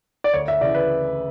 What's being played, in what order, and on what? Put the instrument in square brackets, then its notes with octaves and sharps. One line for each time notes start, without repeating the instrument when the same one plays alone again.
[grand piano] D5
D2 C#5
E5
C#3 E3 D5
B4